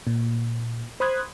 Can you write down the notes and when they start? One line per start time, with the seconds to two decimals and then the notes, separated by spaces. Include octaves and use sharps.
0.07 A#2
1.00 C5 B5 C6 D#6 F#6 G#6